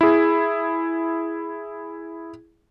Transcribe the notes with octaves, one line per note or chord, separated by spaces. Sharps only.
E4 G#4